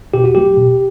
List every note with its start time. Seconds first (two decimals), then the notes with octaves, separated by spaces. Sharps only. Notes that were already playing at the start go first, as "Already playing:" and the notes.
0.14 B2 G4
0.24 F#4
0.35 F#3 A3 G4
0.57 B2